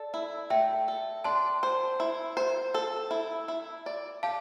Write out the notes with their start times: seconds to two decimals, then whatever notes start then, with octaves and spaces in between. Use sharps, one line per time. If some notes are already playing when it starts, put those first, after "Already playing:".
Already playing: A4 D5
0.14 E4
0.50 A3 E5 G5
0.88 A4
1.24 D4 A5 C6
1.63 C5
2.00 E4
2.37 C5
2.74 A4
3.11 E4
3.48 E4
3.86 D5
4.23 G4 F5 A5